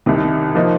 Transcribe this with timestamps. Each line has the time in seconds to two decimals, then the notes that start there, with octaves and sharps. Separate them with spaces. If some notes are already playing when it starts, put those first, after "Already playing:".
0.06 C2 C3 D#3
0.55 F3 A#3 D#4